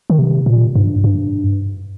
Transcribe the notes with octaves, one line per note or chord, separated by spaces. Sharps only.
D#3
C3
A#2
G2
G2